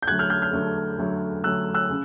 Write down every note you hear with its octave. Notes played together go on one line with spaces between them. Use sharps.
G6
D3 F#3 A3 F#6 G#6
F6 G6
F6 G6
F6 G6
D3 F#3 A3
D3 F#3 A3
D3 F#3 A3 E6 F#6
E6 F#6
C#3